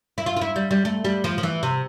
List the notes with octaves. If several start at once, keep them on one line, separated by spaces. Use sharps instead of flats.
E4
F4
F4
E4
G3
G3
A3
G3
F3
F3
E3
C3